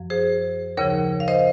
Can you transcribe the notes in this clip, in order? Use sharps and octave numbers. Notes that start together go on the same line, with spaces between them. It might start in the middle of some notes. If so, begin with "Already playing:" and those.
Already playing: F#2 F3
G#4 C5
D#2 C#3 F3 A#4 C#5
F5
C5 D#5